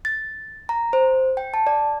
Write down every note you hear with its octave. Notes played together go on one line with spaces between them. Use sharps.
A6
A#5
C5
G5
A5
D5